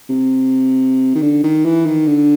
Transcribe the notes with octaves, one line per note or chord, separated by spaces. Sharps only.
C3
D#3
D3
D#3
E3
D#3
D3